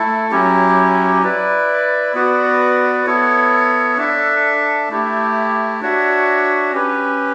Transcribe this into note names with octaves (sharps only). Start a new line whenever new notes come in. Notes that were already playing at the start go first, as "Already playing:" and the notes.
Already playing: A3 E4 A4
F#3 C#4 E4 G4
E4 B4 D5
B3 F#4 B4 D5
B3 E4 A4 C#5
D4 A4 E5
A3 E4 G4
D4 F#4 C#5 E5
C#4 G4 B4